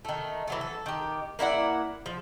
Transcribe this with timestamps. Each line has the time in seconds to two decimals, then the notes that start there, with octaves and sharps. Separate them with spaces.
0.05 D#3 A3
0.47 E3 F#3 A3
0.61 A4
0.86 D#3 G4
1.39 A#3 E4 D5 F#5
2.06 F3